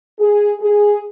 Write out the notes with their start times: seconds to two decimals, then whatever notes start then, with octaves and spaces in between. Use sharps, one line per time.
0.19 G#4
0.61 G#4